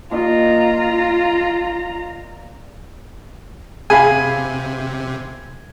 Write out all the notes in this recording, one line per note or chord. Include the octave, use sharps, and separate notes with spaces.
A#2 F4 D#5 F5 A#5
C3 G#4 F5 G#5 B5